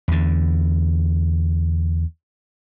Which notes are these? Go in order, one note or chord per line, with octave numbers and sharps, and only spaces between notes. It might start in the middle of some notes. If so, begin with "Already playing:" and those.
E2 D3